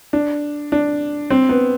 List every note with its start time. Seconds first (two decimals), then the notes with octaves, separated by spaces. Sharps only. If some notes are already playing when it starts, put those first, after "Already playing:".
0.13 D4
0.72 D4
1.30 C4
1.49 B3